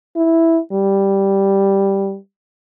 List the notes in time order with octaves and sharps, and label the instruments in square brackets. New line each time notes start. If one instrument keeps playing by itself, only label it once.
[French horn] E4
G3